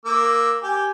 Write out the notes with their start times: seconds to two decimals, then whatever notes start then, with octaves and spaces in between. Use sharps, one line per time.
0.05 A#3 D6 E6
0.62 G4 G#5